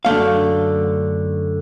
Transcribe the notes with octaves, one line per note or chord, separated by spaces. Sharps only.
F#2 D3 A3 F5